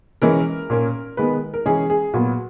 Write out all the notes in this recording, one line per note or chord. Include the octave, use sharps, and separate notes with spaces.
E3 G#3 C#4 A#4
A#2 A#3 C#4
D#3 G#3 B3 B4
A#4
E3 G#3 C#4 G#4
G#4
A#2 F#3 B3 F#4